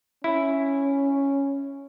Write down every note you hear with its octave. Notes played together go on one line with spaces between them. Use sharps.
C#4 E4